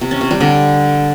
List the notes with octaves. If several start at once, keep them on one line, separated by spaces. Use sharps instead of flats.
C3
C#4
C3
G3
D3